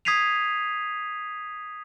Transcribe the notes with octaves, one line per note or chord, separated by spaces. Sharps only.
D#6 G#6 B6 C7 D#7 F7